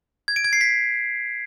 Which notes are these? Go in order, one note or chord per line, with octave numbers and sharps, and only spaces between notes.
G#6
D7
G#6
C7
B6